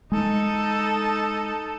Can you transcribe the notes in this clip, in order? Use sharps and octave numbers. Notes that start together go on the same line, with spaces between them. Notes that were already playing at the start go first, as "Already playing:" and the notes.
G#3 D#4 A4